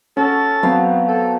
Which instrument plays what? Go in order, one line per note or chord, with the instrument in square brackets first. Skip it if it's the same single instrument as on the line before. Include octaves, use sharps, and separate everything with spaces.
[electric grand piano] C#4 [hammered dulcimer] F#4 [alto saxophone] A4
[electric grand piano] F#3 C4 [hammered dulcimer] B3 F5 A5
[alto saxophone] A4